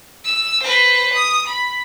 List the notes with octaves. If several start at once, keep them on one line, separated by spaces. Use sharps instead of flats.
E6
B4 C5
D#6
B5